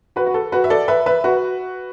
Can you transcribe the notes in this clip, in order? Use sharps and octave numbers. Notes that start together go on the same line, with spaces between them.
F#4 B4
F#4
A4
F#4 B4
E5
A4 D5
B4 E5
B4 E5
F#4 B4